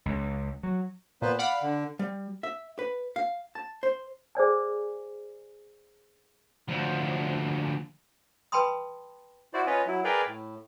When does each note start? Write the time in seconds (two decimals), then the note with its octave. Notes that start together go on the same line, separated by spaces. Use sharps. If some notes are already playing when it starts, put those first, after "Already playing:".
0.06 C#2
0.63 F#3
1.22 A#2 B3 B4 C5
1.39 D5 F5 F#5 B5
1.62 D3
1.99 G3
2.43 E5
2.79 B4
3.16 F5
3.55 A5
3.83 C5
4.35 G#4 C5 D5 G#5
6.68 D2 F3
8.52 B4 G5 A5 B5 C6 D#6
9.54 E4 F#4 C5 D5
9.66 C#4 F4 B4 C#5 D#5
9.87 F#3 E4
10.04 G#4 A#4 B4 D5 F5 G5
10.27 A2